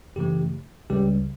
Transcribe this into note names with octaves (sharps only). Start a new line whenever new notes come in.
F#2 C#3 E3 A3 G4
C#2 C#3 G3 G4